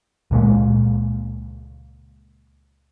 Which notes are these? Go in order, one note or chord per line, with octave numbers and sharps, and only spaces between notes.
C#2 A#2 G#3 A#3